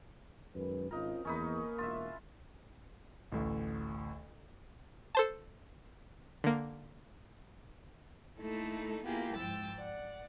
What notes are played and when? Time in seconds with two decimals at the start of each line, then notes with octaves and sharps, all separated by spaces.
0.55 F#2 D#3 G#3 B4
0.91 G#1 C4 C#4 D#4 F4 A#4
1.25 E2 A#3 C#4 D#4 A#4 B4
1.78 E1 F4 E5
3.32 A1 D2
5.15 A4 C5 A5
6.44 D3 A#3
8.38 A3 A#3 D#4 E4 A4
9.04 A#3 B3 E4 F4 G4 G#4
9.36 G#2 F3 G5 E6 A6
9.78 D5 F#5